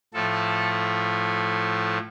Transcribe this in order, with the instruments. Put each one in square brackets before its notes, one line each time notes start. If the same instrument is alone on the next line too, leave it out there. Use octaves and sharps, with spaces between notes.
[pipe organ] A2 F3 A3 A4